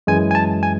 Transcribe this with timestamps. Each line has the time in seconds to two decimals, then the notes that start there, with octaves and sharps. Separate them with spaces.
0.07 F#2 E3 G#3 G#5
0.31 G#5
0.35 A5
0.63 G#5